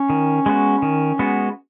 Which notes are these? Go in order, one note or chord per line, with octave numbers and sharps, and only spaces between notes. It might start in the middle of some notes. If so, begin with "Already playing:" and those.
Already playing: C#4
D#3
G#3 B3 F#4
D#3
G#3 B3 F#4